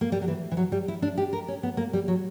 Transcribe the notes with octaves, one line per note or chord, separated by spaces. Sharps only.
A#3
G3
F#3
E3
E3
F#3
G3
E4
D4
G4
A#4
C#4
B3
A#3
G3
F#3